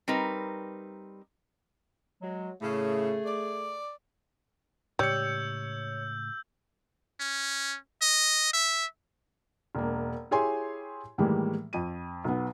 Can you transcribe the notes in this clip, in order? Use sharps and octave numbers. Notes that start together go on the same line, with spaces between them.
G3 C4 D#4 A#4 B4
F#3 G#3
A2 C#3 A3 G#4
D5
A2 C#3 G3 G#3 C#5 E6 G6 C#7
C#4
D#5
E5
E1 A#3
E4 G4 G#4 C#5 G#5 C6
A2 D#3 E3 G3 G#3 A#3
F2 D#7
B1 B3